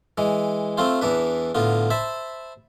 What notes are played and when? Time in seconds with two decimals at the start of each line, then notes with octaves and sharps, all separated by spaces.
0.18 E3 G#3
0.78 A3 C4 F4 C5
1.01 E2 E3 D4 B4
1.55 A2 D3 B3 F4
1.90 C5 E5 A5 B5